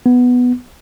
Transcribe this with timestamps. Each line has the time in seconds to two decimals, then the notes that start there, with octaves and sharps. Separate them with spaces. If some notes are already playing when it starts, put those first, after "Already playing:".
0.06 B3